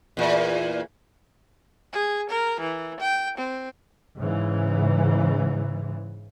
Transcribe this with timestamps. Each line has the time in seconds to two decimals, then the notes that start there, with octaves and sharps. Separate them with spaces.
0.17 E2 A#2
1.93 G#4
2.30 A#4
2.60 E3
3.00 G5
3.38 C4
4.18 G#2 C#3 E3